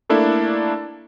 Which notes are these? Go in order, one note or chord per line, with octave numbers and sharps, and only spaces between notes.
A3 A#3 D4 E4 A4